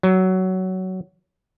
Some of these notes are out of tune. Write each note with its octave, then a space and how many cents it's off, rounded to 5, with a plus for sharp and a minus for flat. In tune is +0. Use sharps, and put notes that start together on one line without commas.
F#3 +15